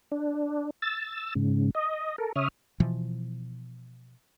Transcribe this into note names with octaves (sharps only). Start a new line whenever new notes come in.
D4
E6 A6
G#2 C#3
D#5
A4 A#4
C#3 C#5 E5 D#6 F6
B2 E3 F3